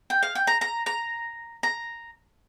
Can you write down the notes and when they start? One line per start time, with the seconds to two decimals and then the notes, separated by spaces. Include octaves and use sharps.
0.10 G5
0.23 F5
0.35 G5
0.47 A#5
0.61 A#5
0.86 A#5
1.63 A#5